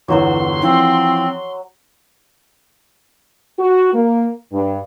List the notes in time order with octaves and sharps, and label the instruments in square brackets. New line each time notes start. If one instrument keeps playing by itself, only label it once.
[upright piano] G1 E2 [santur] F#3 F#4 E6 [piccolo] C6
[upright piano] E3 F3 [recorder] C4
[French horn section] F#4
A#3
G2